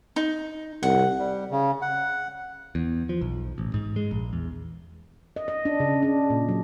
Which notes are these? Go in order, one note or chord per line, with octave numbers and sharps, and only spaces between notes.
D#4
C2 F#5
G3
C#3
F#5
E2
F3
B1
A1
G#2
G#3
A#1
E2
D#5
D#5
D4
C#3
D4
A#2
F#3